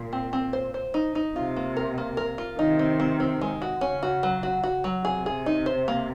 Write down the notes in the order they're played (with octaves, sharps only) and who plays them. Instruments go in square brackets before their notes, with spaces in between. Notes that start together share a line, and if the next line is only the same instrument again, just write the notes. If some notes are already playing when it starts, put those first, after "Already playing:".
Already playing: [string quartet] A#2
[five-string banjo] C4
C4
C5
C5
D#4
D#4
[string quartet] C3 [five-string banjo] F4
[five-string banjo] A#3
A#4
A#3
A#4
F4
[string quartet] C3 D#3 [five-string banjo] D#4
[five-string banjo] C4
C4
C4
G#3
F#4
[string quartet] C#3 [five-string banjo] C#4
[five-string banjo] F#4
F#3
F#4
F#4
F#3
[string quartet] C3 [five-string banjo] G#4
[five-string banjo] G#4
D#4
C5
A#3